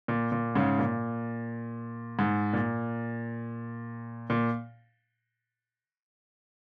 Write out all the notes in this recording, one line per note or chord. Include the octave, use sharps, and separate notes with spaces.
A#2
A#2
G#2 C#3
A#2
G#2
A#2
A#2